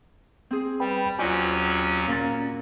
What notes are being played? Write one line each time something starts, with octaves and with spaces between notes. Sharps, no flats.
C4 G#4
G3 B4 G5 B5
D#2 F#3 C#4 F4 F#4 C5 D5 G#5
A#2 C#4 A6